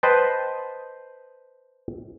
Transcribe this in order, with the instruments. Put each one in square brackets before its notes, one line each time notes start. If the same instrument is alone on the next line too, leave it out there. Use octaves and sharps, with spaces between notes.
[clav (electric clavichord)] B4 C5 D#5 G5 A5